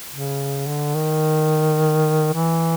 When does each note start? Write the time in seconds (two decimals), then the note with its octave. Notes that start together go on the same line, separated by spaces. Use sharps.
0.11 C#3
0.67 D3
0.95 D#3
2.33 E3